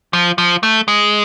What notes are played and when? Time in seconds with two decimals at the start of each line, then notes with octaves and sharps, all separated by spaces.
0.13 F3
0.38 F3
0.63 A3
0.88 G#3